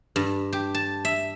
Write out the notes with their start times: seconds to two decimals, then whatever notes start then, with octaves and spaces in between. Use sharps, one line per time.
0.16 G2
0.53 G4
0.74 A5
1.05 E5